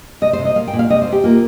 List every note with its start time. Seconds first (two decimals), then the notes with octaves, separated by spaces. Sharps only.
0.21 C3 D#5
0.33 C5
0.39 C3
0.45 D#5
0.56 A#2 F5
0.67 G5
0.73 A#2
0.79 F5
0.90 C3 D#5
1.02 C5
1.08 C3 G4
1.24 A#3 F4